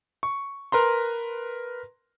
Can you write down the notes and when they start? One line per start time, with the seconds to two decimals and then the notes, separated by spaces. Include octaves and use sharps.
0.23 C#6
0.72 A#4 B4 A#5 C6